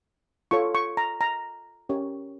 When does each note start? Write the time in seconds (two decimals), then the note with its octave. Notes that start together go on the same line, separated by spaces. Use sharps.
0.51 F4 A4 C#5 C#6
0.75 C#6
0.97 A#5
1.21 A#5
1.89 C#4 G4 A#4 C#5